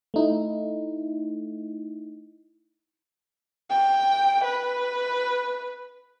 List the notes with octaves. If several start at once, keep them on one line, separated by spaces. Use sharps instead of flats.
A3 D#4 E4
G5
B4